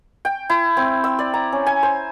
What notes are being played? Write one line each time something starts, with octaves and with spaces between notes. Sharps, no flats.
G5
E4
C4
E6
D5
A#5
C#4
G#5
C5